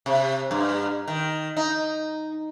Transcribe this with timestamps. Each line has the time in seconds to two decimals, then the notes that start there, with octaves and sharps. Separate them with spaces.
0.06 C3
0.51 G2
1.08 D#3
1.57 D#4